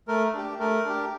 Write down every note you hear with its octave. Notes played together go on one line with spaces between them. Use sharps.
A3 A#4
D4 G4
A3 A#4
D4 G4